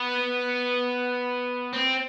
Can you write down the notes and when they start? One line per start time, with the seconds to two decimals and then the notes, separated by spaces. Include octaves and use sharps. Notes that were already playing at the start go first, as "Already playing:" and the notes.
Already playing: B3
1.73 C4